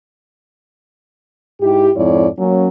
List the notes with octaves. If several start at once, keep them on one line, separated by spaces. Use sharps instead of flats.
G#2 E4 G4
F2 G#2 E4 C#5 D5
F#3 A#3 C#4